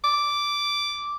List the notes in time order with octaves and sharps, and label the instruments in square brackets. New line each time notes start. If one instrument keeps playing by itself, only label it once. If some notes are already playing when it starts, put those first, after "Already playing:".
[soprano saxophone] D6